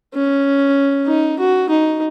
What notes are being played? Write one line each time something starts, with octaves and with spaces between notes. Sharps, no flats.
C#4
D#4
F#4
D#4